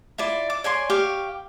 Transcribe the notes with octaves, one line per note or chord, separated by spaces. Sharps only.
E4 F4 D5
D6
C#5 D5 G#5 C6
G4 F5 C#6